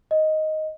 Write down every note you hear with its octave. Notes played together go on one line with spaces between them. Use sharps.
D#5